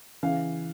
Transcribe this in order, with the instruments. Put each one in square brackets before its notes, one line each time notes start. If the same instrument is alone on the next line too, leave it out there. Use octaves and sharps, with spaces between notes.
[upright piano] C#3 E3 F5